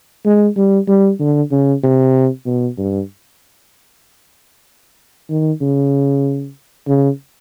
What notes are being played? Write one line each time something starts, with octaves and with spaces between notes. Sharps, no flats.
G#3
G3
G3
D3
C#3
C3
B2
G2
D#3
C#3
C#3